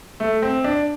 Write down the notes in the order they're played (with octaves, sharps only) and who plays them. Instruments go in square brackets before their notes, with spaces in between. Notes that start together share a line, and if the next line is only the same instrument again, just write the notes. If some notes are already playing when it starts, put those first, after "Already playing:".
[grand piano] A3
C4
D4